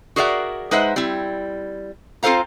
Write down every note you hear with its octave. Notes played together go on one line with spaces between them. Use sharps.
F#4 G#4 A#4 D5 E5 F#5
G#3 D#4 B4 C5 E5 F#5
G3 C4 E4
C4 F4 A4 C5 F5 A#5